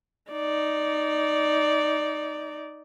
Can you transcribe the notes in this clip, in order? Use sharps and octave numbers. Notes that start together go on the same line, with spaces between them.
D#4 D5